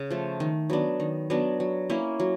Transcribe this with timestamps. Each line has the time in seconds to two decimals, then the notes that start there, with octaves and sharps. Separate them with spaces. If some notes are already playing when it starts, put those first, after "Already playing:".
Already playing: C#3
0.10 F3 A3
0.40 D#3
0.70 F#3 B3 D4
1.00 D#3
1.30 F#3 B3 D4
1.60 F#3
1.90 A#3 C#4 E4
2.20 F#3